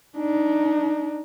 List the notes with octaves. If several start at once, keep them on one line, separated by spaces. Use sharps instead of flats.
D4 D#4